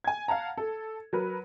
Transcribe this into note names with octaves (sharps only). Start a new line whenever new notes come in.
G#5 G#6
F5 F#5 A5 A#5
A4
F#3 A#4 B4